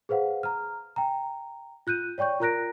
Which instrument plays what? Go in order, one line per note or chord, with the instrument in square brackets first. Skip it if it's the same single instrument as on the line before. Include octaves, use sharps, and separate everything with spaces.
[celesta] G#4 B4 C5 F5 F#5
A#5 F6
G5 A#5
F4 F#6 G6 D#7
C#5 D5 G5 C#6 G6
F4 A#4 A#5 F#6 A#6 D7